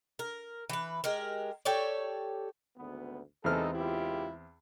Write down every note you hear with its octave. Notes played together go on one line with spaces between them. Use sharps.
A#4
E3 B4
G#3 G4 A#4
G4 A4 C#5 D5
G#1 D2 B3
E2 C3 G#3 C4 D#4 A4 F6
C#2 E4 F4 G4